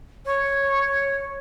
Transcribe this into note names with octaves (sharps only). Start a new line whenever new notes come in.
C#5